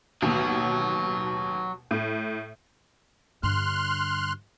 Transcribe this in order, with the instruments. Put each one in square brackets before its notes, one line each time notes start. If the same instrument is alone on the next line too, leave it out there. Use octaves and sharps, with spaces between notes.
[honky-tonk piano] A1 D#2 B2 [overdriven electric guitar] F#3
[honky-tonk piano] A2
[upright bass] G2 D3 [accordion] C6 F6 F#6